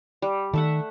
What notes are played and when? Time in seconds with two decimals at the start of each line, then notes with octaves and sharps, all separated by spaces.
0.22 G3
0.54 D#3 A3 E5 F#5